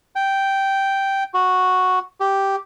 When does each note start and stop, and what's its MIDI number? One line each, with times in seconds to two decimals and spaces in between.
0.16 1.24 79
1.34 1.99 66
2.20 2.56 67